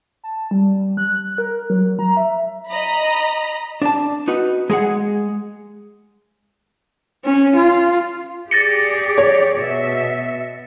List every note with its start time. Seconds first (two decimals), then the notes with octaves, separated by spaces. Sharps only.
0.24 A5
0.51 G3
0.97 F#6
1.38 A#4
1.70 F#3
1.99 A#5
2.17 E5
2.69 D#5 A#5 B5
3.82 D4 A5
4.28 D#4 F#4 B4
4.70 G#3 G#4 F#5
7.25 C#4
7.55 F4
8.51 G4 G#4 D5 A6 A#6 C#7
9.18 C#5
9.59 B2 E5